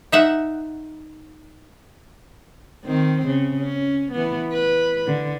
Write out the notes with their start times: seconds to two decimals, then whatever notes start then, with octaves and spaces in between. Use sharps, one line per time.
0.12 D#4 E5 F#5
2.85 D#3 C4
3.26 C#3
3.59 C#4
4.11 E3 B3
4.52 B4
5.06 D3